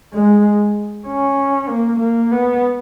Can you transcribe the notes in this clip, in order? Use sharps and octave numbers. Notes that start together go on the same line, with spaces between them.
G#3
C#4
A#3
A#3
B3